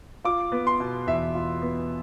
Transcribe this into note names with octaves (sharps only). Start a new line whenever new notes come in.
F4 D6
B3
C6
B2
E2 E5
F4
B3